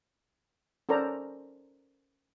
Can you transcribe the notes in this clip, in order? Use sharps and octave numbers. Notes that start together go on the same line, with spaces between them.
C#4 A4 A#4 C5 D5 A#5